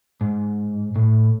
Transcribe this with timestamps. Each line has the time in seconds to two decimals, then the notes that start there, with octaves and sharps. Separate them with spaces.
0.21 G#2
0.96 A2